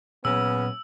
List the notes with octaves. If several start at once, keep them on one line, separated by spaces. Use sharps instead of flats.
A#2 C#3 F#3 B3 C#4 E6